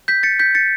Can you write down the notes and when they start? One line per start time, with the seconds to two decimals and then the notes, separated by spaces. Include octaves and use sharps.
0.08 G6 B6
0.23 A6 C#7
0.39 G6 B6
0.55 A6 C#7